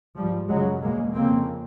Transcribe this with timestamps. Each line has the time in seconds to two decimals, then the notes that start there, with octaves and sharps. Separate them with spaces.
0.17 G#2 F3 G3
0.49 F#2 C#3 F#3 G#3
0.82 E2 B2 G#3 A#3
1.15 F2 C#3 A#3 C4